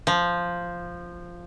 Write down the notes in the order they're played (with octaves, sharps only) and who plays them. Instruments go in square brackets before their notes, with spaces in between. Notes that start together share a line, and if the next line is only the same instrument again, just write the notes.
[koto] F3